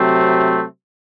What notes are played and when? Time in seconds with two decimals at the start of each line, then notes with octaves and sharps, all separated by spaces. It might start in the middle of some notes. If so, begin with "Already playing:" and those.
Already playing: C3 F#3 A3 C4